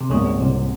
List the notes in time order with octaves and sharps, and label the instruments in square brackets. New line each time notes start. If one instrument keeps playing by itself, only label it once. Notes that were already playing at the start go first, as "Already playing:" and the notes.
[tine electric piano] C3
[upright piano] G#1 G#2 G3 A#3 C#4 [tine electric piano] C#2 C#3
[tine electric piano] C2 C3